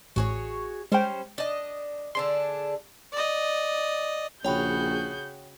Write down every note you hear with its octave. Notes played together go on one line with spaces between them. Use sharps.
A1 F#4 G#4 C#5
G3 G#3 C#4 C5 G5
D4 D#5
D3 D4 G#4 C6
D5 D#5
A#1 C#3 F#4 G#4 C#5 G5 B5 G6